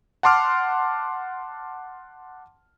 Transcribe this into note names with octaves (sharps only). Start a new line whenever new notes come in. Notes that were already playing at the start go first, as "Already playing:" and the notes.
F#5 A5 C6 D6 F6